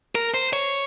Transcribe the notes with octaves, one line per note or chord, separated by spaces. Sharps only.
A#4
C5
C#5